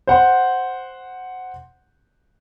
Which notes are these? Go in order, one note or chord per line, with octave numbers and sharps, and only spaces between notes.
C5 F#5 C6